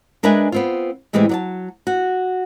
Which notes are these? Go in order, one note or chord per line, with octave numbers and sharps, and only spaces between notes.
G#3 D4 A#4 B4 E5 G#5
B3 C4 F4
A2 E3 G#3 A3 C4 G4
F#3 D5 A5
F#4